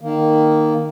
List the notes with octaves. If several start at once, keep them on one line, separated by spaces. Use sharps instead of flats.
D#3 A#3